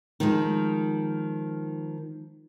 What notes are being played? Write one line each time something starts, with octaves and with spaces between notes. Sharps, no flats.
D#3 F3 G#3